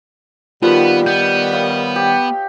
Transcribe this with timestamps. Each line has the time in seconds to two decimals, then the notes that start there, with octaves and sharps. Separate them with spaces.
0.63 D#3 F3 G3 B3 F4 F#4 B4
1.06 B3 G6
1.52 C#5 D#5 F5
1.96 G4 G5